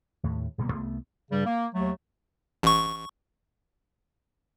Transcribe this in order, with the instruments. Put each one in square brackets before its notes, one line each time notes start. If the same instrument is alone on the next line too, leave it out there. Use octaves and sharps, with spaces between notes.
[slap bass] D#2 A2
D1 B2 G3 A#3
C2 A3 B3
[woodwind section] G2 C#3 G3
A#3
D#2 F#3 A3
[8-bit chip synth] A1 C#6